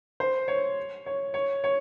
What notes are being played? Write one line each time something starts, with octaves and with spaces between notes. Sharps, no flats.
C5
C#5
C#5
C#5
C#5